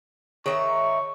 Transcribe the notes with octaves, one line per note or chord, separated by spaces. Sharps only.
D#3 G#4 C#5 E5 A#5 C#6